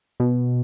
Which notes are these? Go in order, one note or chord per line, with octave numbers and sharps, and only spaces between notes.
B2